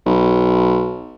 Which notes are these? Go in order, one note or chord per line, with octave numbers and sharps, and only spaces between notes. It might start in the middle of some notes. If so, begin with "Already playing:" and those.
B1